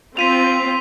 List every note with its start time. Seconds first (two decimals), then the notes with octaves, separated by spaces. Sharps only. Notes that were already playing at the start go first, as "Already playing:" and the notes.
0.17 C4 F4 B6 D#7 F7